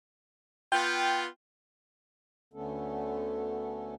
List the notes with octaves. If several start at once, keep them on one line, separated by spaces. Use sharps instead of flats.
B3 F4 G5 G6
D2 D3 A3 B3 C#4 A4